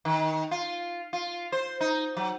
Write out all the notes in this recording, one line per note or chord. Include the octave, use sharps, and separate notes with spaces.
D#3
F4
F4
C5
D#4
F#3